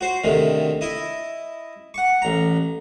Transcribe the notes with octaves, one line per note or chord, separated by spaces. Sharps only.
F#4 C5
D2 C3 D#3
E4 D#5
F#5 C#6
A1 A#5